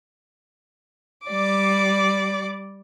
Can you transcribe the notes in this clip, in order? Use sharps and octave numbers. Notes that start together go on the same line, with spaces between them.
G3 D5 D6